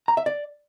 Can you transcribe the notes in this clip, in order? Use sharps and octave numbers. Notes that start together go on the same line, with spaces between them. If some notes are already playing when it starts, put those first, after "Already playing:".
A#5
E5
D5